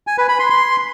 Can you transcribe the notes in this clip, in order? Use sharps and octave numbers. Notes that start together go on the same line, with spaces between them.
G#5
B4
B5
C6
C6